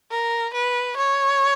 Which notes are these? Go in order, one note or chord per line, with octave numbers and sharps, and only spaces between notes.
A#4
B4
C#5